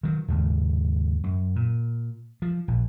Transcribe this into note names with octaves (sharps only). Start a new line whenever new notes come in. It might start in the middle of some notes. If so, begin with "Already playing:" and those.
D#3 F#3
D#2 G#2 C#3
F#2
A#2
F3
A#1